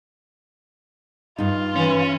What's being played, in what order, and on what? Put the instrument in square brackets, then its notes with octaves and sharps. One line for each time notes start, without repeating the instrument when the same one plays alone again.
[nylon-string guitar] G2 D#4 [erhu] F4
[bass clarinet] E3 [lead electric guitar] C#4